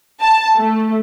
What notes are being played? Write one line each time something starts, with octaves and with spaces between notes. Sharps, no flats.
A5
A3